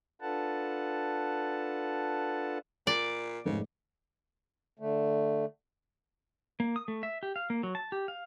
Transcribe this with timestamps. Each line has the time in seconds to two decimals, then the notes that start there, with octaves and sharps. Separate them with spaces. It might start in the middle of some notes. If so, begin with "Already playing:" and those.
0.22 D4 F4 A4 B4 F#5 A5
2.87 A#2 D5
3.45 F1 G#2 C#3
4.79 D3 A3
6.60 A#3
6.76 D#6
6.88 A3
7.03 E5
7.23 G4
7.36 F5
7.50 A#3
7.63 F#3
7.75 A5
7.92 G4
8.08 F5